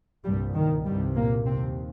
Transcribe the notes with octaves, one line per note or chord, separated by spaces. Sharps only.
C2 G2 A#2 G3
D#3
C2 G2 C3 G3
A#2 A#3
D#2 C3 C4